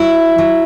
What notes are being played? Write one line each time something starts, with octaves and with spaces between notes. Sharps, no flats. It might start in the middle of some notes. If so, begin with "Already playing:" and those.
Already playing: F#3 E4
F#3